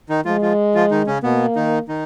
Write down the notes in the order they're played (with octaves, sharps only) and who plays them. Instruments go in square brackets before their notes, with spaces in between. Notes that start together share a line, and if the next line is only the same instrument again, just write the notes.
[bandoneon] D#3 D#4
[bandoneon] F3 F4 [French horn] G#3
[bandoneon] F3 F4
F3 F4
D#3 D#4
C#3 C#4
[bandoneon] B2 B3 [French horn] A#3
[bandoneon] D#3 D#4
D#3 D#4